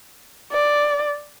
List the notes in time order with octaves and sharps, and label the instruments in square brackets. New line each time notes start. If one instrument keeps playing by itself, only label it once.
[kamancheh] D5